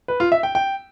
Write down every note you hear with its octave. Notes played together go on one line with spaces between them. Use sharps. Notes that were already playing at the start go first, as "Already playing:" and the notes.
B4
F4
E5
G5
G5